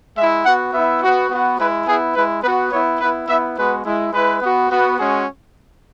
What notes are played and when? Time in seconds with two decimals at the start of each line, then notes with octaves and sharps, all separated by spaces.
0.17 G#3 E4 E5
0.45 B3 F#4 F#5
0.73 B3 E4 E5
1.02 B3 F#4
1.30 B3 F#4
1.59 G#3 E4 B4
1.87 B3 E4 G#4
2.15 G#3 E4 B4
2.43 B3 B4
2.48 F#4
2.72 B3 E4 C#5
3.00 B3 E4 B4
3.28 B3 E4 E5
3.57 G#3 B3 F#4 B4
3.85 G#3 E4
4.13 G#3 E4 B4
4.41 B3 F#4
4.70 B3 F#4
4.98 G#3 C#4 F#4 G#4